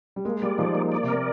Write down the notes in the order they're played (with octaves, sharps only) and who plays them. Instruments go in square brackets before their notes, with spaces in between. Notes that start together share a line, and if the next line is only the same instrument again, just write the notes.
[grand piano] G3
[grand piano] G#3 [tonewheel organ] A#3
[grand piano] G3 [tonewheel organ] D5
[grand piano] F3 [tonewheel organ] D#4
[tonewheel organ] A#3
D5
[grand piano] C3
[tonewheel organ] A#4